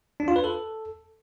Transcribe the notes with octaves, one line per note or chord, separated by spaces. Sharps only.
D4
F4
B4
A4